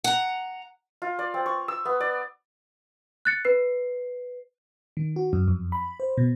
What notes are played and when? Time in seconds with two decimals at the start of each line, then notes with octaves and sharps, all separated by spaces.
0.04 F#5 A#5
1.02 F4
1.19 D5
1.34 C4
1.46 C#6
1.68 E6
1.85 B3
2.00 D5
3.25 F#6 A6 C#7
3.45 B4 C7
4.97 D#3
5.16 F#4
5.33 F#2
5.48 F2
5.72 B5
6.00 C5
6.18 B2